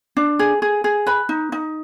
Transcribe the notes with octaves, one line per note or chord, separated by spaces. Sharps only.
D4
G#4
G#4
G#4
B4 B5
D#4
D#4